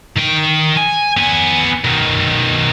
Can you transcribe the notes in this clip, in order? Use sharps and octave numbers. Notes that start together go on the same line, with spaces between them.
D#3 G5
G#5
B3 G#5
B2 D#3